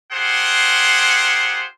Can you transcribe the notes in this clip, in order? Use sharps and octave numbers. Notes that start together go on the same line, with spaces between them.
F4 G4 G#4 A#4 C5 F#5